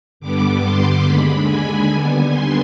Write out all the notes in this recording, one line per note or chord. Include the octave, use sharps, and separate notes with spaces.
G2 D3 G3 B3 D6
C6
D#2 D3 G#3 B5
G#5
D#2 D3 G3 B3
C6